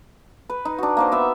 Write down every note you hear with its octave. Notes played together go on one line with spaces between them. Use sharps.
B4
D#4
D4 F#4
A#3 D#4 C5
B3 E5